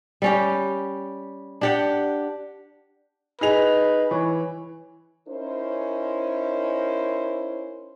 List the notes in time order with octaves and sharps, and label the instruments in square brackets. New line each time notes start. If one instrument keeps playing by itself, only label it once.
[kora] G3 C#4 G4
D4 G4 F#5
[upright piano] D#4 G#4 F7 [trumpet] B4
[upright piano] E3 [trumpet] C#5
[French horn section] C#4 D#4 E4 A#4 C5